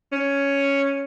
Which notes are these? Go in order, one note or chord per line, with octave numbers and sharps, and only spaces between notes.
C#4